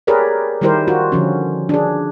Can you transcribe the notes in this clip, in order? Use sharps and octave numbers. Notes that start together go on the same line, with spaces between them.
G4 G#4 A#4 B4 C#5 D5
D#3 G3 E4 G4 A#4 C5
F4 F#4
D3 F3 C#4
D4 G#4